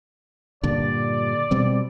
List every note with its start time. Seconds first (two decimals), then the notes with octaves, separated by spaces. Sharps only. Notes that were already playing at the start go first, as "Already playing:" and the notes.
0.63 G2 A#2 D3 D5
1.51 B2 G3 C4